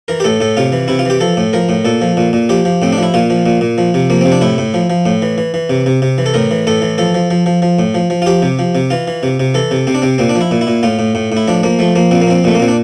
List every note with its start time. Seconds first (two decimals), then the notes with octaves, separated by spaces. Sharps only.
0.08 E3 A#4
0.20 G4
0.24 A2 A4
0.40 A2 A4
0.57 C3 F4
0.72 E3
0.88 C3 E4
0.99 F4
1.05 E3 G4
1.21 F3 A4
1.37 A2
1.53 F3 A#4
1.69 A2
1.85 A#2 A4
2.01 F3
2.17 A#2
2.33 A#2
2.49 F3 G4
2.65 F3
2.82 A2 C4
2.93 D4
2.98 F3 E4
3.14 A#2 F4
3.30 F3
3.46 A#2
3.61 A#2
3.78 F3
3.94 C3
4.10 F3 A#3
4.21 C3 C4
4.32 D4
4.41 A2 E4
4.58 A2
4.74 F3
4.90 F3
5.06 A2
5.22 E3
5.38 E3
5.54 E3
5.70 C3
5.86 C3
6.02 C3
6.18 E3
6.26 A4
6.34 A2 A#4
6.51 E3
6.67 A2 A4
6.82 E3
6.98 F3 A4
7.14 F3
7.31 F3
7.46 F3
7.62 F3
7.79 A2
7.94 F3
8.10 F3
8.22 F4
8.26 F3 G4
8.42 C3
8.59 F3
8.75 C3
8.90 E3 F4
9.07 E3
9.23 C3
9.40 C3
9.54 E3 A4
9.71 C3
9.87 C3 C4
9.95 D4
10.02 C3 C4
10.18 A#2 C4
10.29 D4
10.35 F3
10.41 E4
10.51 A#2
10.61 E4
10.67 A#2
10.83 A2 F4
10.99 A2
11.15 A2
11.32 A2 E4
11.48 F3 D4
11.63 F3 A#3
11.79 F3 A3
11.96 F3 A#3
12.11 A#2 C4
12.21 A#3
12.27 F3 C4
12.44 A#2 A3
12.55 A#3
12.60 A#2 C4
12.68 D4